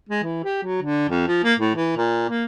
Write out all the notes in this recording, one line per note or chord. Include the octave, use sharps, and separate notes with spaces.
G#3
E3
G4
F#3
D3
F2
F3
A#3
A2
E3
A#2
A#3